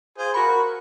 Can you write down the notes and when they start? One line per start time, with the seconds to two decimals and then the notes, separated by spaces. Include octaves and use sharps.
0.18 F4 G#4 C5
0.34 F#4 A#4 B5 C#6